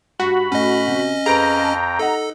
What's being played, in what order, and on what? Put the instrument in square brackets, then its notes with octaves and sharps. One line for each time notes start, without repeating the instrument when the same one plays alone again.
[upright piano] G2 [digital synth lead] F#4 [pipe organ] B5
[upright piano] A2 [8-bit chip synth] C#4 D#5
[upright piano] C3
[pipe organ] F2 G5 [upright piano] G#4 B4 D7 [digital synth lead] A#5
[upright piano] A5
[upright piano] D#4 D#5 F#5 [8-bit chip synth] A4